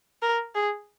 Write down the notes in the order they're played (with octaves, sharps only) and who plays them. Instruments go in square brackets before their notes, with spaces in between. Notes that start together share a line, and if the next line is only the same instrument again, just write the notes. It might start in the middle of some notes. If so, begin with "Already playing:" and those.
[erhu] A#4
G#4